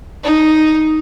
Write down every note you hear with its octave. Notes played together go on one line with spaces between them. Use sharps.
D#4